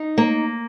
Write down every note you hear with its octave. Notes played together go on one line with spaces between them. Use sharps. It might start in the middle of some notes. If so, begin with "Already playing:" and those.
Already playing: D#4
A#3